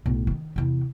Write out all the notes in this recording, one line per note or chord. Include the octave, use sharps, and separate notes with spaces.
B1 A2
D#3 E3
E2 C3